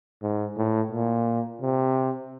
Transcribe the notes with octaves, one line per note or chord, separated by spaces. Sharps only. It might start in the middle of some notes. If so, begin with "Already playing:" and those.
G#2
A2
A#2
C3